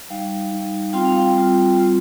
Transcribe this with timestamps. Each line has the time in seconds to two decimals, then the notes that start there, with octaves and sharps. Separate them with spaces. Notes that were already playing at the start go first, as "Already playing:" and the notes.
0.10 G3 D#4 F5
0.51 G3 D#4
0.93 G3 C4 F4 G5
1.05 F5
1.17 G5
1.34 G3 C4 F4
1.76 G3 C4 F4